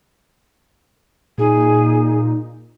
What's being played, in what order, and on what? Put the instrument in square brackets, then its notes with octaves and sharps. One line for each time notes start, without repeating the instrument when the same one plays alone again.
[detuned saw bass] A#2 [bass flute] D#4 [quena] G#4